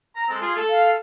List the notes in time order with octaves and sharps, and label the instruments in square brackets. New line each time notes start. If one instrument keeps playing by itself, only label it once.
[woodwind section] A#5
G#3 C4 A4
F4 G#4
A4
[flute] F5